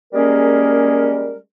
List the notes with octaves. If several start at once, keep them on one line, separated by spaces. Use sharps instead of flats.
G3 G#3 A#3 C#4 G#4 A#4